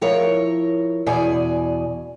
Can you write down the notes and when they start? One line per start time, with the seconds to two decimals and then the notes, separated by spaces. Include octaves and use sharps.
0.01 F3 E4 A#4 C#5
1.06 E2 B2 D5 G#5